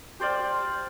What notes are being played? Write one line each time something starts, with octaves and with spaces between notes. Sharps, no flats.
G4 C5 D5 F5